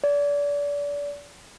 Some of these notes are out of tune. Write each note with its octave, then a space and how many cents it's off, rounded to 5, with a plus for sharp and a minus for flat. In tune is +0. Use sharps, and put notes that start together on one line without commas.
D5 -30